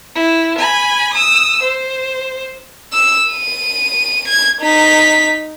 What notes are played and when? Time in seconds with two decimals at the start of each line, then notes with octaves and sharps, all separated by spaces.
0.15 E4
0.58 G#5 B5
1.14 D#6 E6
1.62 C5
2.93 E6
3.30 D#7
4.28 G#6
4.62 D#4 B6